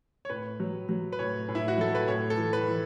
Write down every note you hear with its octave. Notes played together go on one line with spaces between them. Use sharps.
C#5
A2 B4
F#3
F#3
B4
A2 C#5
A2
E4
F#4
F#3 A4
B4
A2 C#5
A4
E3
B4
E3